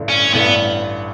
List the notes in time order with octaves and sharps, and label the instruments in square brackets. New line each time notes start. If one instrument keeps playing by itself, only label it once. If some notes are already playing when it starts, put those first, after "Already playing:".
Already playing: [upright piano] A1 G2 D3
[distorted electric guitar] C#4
[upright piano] A1 G2 D3 [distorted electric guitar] B3